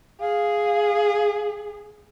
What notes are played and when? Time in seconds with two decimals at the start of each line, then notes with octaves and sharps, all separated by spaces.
0.20 G#4 F5